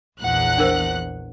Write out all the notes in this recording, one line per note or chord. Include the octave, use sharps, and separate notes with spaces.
A#1 E2 F#5 F#6
D4 A#4 C5